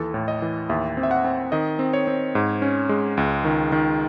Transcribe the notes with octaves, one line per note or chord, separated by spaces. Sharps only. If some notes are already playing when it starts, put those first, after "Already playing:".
Already playing: D#2 E3 A4
A2
D#5
E3
D#2 E5
C4
E5
F#5
C4
D#3 D#5
C4
C#5
C4
G#2
C#4
G#3
C#2
D#3
D#3